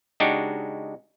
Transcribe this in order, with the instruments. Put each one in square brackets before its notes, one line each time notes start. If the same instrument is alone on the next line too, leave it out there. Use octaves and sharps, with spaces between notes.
[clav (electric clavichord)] C#3 G#3 D4 D#4 F#4 G4